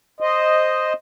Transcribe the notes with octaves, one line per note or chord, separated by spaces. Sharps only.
C5 D#5